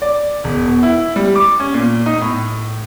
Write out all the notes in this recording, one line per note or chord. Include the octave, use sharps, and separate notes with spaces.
D5
E1
B2
E4
G3
D6
C#4
A#2
D#4
A2